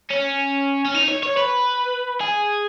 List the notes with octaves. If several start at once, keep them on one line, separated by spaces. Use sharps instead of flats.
C#4
C#4
D#4
C#5
C#5
B4
G#4